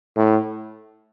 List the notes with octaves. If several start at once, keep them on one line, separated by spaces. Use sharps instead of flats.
A2